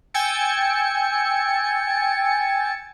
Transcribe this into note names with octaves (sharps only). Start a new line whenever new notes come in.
G5 G#5 E6 G#6 A6 C#7